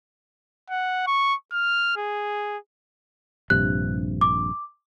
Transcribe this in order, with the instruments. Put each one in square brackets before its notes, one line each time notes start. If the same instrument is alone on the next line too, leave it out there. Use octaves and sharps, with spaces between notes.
[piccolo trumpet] F#5
C#6
F6
G#4
[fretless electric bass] A#1 G2 C3 [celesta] F#6
[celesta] D6